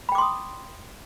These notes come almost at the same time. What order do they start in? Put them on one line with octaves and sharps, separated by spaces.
B5 G5 D6 C6 D#6